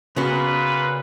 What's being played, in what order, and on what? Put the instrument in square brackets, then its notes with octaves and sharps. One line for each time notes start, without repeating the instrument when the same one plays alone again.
[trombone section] A#2 B4 [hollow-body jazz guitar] C#3 B3 F#4